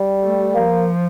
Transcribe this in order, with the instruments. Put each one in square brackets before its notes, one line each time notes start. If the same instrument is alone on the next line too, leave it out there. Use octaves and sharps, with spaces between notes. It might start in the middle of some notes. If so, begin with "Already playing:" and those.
Already playing: [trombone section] G3
[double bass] A3
[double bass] F3 [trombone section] A#3